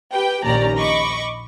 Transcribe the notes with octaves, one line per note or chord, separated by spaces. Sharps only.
G4 B4 G5
A#1 D#2 C#4 G4 D5 A#5
D#5 B5 C#6 D6